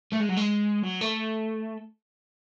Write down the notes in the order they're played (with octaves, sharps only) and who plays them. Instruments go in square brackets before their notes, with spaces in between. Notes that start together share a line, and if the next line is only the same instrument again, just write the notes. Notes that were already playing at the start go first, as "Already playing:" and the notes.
[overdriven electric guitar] A3
G#3
F#3
G#3
F#3
A3